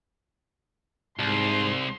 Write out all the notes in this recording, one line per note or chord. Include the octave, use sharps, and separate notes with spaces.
C2 G#2 C6